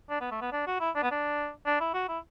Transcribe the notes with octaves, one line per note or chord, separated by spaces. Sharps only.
D4
B3
A3
B3
D4
F#4
E4
D4
B3
D4
D4
E4
F#4
E4